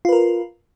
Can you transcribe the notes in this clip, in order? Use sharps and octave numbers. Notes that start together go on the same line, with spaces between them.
F4 A#4 B4